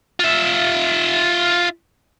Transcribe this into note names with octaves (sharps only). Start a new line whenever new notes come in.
F4 E5